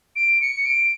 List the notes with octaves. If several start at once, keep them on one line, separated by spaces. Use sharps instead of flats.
D7
C#7
D7